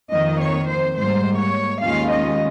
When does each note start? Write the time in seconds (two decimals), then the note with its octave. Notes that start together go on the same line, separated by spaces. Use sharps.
0.12 F2 D#3 A#3 D#5
0.41 C#5
0.68 C5
0.96 G#2 G3 A#3 C5
1.39 C#5
1.81 D#2 D#3 G#3 C#4 F4 F5
2.09 D#5